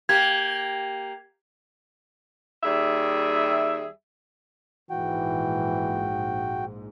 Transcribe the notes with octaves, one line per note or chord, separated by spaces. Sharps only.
A#3 G4 G#6
D#2 G3 G#4 E5
A#1 G#2 E3 F#4 G5